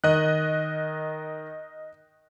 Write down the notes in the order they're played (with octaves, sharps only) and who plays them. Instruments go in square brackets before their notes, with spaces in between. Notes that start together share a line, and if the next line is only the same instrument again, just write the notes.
[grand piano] D#3 [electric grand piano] D#5 F#6